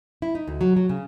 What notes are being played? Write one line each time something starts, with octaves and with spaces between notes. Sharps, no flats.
E4
D#4
D2
F#3
F#3
C#3